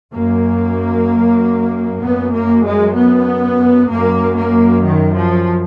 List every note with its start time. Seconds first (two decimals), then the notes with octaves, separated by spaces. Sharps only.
0.14 F#2 A#3
2.02 F#2 B3
2.34 A#3
2.65 G#3
2.96 B3
3.90 F#2 A#3
4.37 A#3
4.85 D#3
5.16 F3